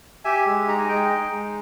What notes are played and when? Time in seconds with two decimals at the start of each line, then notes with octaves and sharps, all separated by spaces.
0.25 G4 E5 G#5
0.46 G#3
0.67 D#4 A#5
0.79 G#5
0.89 G#3 D#5 G5
1.10 D#4
1.31 G#3